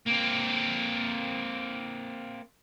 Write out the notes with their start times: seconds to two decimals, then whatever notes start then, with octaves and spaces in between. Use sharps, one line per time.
0.06 A#3 C4